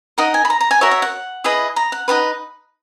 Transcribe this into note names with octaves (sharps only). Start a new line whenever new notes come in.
D#4 A#4 D#5 F#5
G#5
B5
A#5
A#5
G#5
F#4 A#4 C#5 E5
E5
F#5
E4 G#4 B4 D#5
A#5
F#5
D#4 F#4 B4 F#5